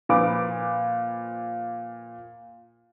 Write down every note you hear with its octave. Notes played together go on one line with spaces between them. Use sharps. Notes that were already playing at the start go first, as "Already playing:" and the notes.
A#2 F3 B4 D6 D7